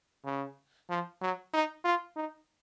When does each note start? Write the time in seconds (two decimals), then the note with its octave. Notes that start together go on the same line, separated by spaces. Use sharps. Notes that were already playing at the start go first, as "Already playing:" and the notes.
0.25 C#3
0.90 F3
1.21 F#3
1.53 D#4
1.85 F4
2.16 D#4